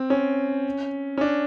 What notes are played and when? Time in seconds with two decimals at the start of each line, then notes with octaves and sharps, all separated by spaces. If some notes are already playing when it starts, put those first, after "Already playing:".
Already playing: C4
0.10 C#4
1.18 C#4
1.21 D4